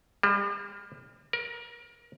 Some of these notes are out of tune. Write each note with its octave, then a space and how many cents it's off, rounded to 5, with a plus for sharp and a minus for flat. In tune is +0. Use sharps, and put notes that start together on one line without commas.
G3 +40
A#4 +30